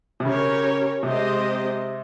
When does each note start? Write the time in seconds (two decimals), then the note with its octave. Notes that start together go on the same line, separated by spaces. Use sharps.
0.20 C3
0.24 C#3 C#4 G4 A#4 C#5
1.03 C3 G#3 C4 G4 C5 D#5